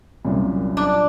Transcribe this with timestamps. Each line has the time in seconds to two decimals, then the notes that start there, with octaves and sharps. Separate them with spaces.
0.25 C2 F#2 A#2
0.77 D4